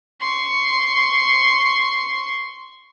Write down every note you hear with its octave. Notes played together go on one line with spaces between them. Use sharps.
C6 C#6